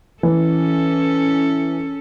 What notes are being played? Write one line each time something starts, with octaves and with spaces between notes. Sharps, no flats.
E3 C#4 A4